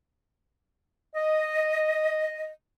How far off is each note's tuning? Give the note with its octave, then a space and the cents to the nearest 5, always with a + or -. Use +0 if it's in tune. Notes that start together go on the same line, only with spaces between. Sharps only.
D#5 -5